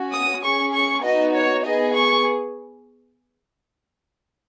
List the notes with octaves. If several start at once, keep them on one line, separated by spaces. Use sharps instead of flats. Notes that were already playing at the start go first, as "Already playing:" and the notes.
Already playing: C#4 F#4
D#6
C#4 G#4 C#6
C#6
B3 D#4 F#4 D#5
C#5
B3 G#4 D#5
C#6